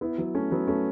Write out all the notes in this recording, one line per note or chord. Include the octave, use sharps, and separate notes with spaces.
B3 E4
F#3 B3
A3 C#4
F#3 B3
A3 C#4